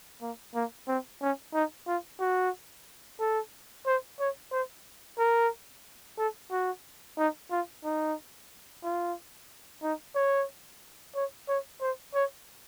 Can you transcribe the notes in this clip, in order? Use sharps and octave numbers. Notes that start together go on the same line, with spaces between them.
A#3
A#3
C4
C#4
D#4
F4
F#4
A4
C5
C#5
C5
A#4
A4
F#4
D#4
F4
D#4
F4
D#4
C#5
C#5
C#5
C5
C#5